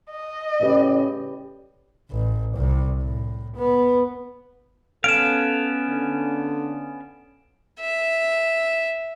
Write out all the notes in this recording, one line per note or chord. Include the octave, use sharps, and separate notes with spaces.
D#5
A2 C#3 C#4 G4 B4 D5
A1
C2
A2
B3
B3 C#4 A4 F5 D7 E7
D3
E5